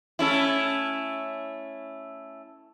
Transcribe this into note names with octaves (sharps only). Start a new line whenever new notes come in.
A3 C#4 E4